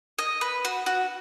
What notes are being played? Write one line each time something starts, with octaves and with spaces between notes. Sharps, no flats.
D#5
B4
F#4
F#4